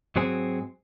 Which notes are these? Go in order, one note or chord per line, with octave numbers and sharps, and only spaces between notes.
G#2 F#3 C4 G#4